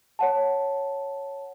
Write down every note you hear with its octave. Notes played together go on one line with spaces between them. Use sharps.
C#5 F#5 A5